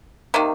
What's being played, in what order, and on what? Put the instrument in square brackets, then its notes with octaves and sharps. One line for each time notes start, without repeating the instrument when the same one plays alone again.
[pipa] C3 D#3 A#3